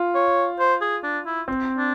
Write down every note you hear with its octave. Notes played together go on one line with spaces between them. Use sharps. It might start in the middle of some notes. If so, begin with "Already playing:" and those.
Already playing: F4
C#5
C5
G#4
D4
E4
C4
D4